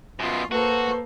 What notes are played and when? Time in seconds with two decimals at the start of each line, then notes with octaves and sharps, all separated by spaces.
0.20 F#2 B2 F4
0.52 A#3 F#4 A4 B4 C5